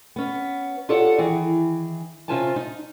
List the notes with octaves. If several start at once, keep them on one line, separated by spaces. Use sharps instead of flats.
B3 C#4
F4 G4 A4 C#5 D5 F#5
D#3 E3 G#4
C3 C#4 F4 C5 G#5 A5
D#4